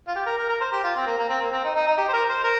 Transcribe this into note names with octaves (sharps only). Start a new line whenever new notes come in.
F4
G4
A#4
A#4
A#4
C5
G4
F4
C4
A#3
A#3
C4
A#3
C4
D#4
D#4
D#4
G4
C5
A#4
C5
A#4